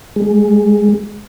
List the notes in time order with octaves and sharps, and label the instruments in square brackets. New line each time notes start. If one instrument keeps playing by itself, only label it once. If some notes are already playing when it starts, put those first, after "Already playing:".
[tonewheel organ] G#3